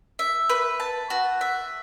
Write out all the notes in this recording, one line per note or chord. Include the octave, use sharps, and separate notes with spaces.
E5
B4
A5
F#4
E5